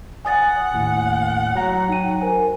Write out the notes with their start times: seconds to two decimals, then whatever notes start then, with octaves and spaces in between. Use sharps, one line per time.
0.25 F#5 G#5 D#6 A6
0.74 D#2 A2
1.55 F#3 A#5
1.89 D#4 G5 D#7
2.21 A#4 C5 G#5